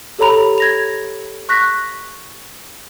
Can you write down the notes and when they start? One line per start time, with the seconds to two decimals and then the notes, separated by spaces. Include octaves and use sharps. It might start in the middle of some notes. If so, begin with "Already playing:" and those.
0.19 G4 A4 C#5 A#5 B5 F7
0.58 G#6 A#6 F7
1.49 C#6 F#6 A#6 B6